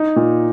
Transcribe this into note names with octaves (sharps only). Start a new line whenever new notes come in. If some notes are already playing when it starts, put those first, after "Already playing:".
Already playing: D#4
A#2